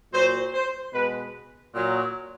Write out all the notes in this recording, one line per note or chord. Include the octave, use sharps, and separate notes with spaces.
A#2 F#3 C5
C5
B2 G#3 B4
A#2 F#3